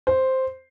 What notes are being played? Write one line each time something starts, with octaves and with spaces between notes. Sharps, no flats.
C5